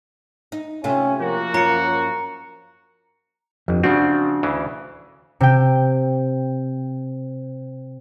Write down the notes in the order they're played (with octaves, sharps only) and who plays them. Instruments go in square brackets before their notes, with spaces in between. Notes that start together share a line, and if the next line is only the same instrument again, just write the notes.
[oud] D#4
[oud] C3 A3 F4 [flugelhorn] C#4
[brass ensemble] F3 A#3 F#4 [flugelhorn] A#4
[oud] F#2 C#4 F4 [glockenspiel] A#5 C#7
[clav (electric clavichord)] G1 [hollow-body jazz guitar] F2
[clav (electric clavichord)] C#3 F3 C4 [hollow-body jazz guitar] D4 F#4
[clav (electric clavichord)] D2 C#3 E3
[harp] C3 G5